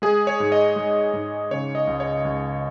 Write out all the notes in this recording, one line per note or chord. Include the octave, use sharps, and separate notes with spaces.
G#3 G#4
C#5
G#2
D#5
G#3
G#2
C#3 C#5
D#5
C#2
C#5
C#2